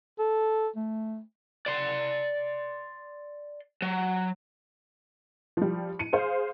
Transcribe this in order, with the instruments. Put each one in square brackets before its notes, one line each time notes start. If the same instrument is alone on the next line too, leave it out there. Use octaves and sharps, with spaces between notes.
[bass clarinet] A4
A3
[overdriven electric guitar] D5 C6
F#3
[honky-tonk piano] F3 G3
C#7 D#7
G#4 C5 F5